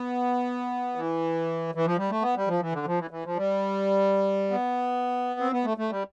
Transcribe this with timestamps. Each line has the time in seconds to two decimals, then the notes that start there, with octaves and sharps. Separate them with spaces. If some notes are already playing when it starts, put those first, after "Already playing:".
Already playing: B3
0.96 E3
1.75 E3
1.86 F3
1.97 G3
2.10 A3
2.22 B3
2.36 G3
2.47 F3
2.60 E3
2.72 D3
2.86 F3
2.99 E3
3.11 E3
3.24 F3
3.36 G3
4.51 B3
5.40 C4
5.52 B3
5.64 A3
5.77 A3
5.90 G3